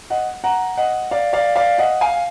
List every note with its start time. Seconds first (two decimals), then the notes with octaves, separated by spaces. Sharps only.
0.10 D#5 F#5
0.44 F#5 A#5
0.77 D#5 F#5
1.11 D5 F5
1.33 D5 F5
1.56 D5 F5
1.78 D#5 F#5
2.01 F5 G#5